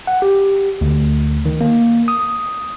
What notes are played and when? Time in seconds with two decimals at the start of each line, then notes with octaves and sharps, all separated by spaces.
0.07 F#5
0.22 G4
0.81 D2
1.46 D#3
1.61 A#3
2.08 D#6